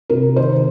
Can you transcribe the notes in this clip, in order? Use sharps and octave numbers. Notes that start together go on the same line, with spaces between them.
C3 A#4
D#3 C5